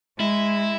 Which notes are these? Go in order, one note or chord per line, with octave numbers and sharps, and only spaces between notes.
G#3 E4